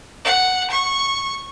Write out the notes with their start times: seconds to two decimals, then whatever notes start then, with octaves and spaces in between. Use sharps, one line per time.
0.24 F#5
0.70 C#6